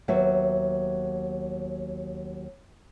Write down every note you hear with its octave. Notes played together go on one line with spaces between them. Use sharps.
D#2 F#3 B3 E5